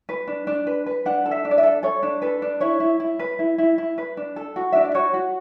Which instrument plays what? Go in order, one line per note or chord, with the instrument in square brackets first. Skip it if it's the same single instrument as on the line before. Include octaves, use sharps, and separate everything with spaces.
[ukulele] B4
D4
D4
B4
B4
D4 F#5
A4
E5
D4
D5
E5
A4
A4 C#5
D4
A4 B4
D4
E4 C#5
E4
E4
B4
E4
E4
E4
B4
D4
A4
F#4
D4 E5
D5
F#4 C#5
F#4